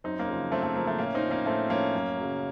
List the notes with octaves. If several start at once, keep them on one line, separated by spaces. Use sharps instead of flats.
F#2 C4 D#4
A#3 C#4
C#3 F3
F#2 A3 C4
A3
C#3 F3 A#3
A3 C4
A2 A#3 C#4
C4 D#4
F3
A#3 C#4
A2 A3 C4
F3 A#3 C#4
F#2
C#3 F#3